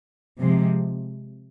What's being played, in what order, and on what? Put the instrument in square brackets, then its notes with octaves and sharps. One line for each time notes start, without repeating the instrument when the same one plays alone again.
[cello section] C3 F3 G#3